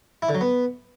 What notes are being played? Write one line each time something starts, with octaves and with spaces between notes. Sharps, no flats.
E4
D3
F#3
B3